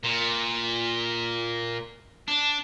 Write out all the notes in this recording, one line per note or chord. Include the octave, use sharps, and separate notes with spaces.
A#2
D4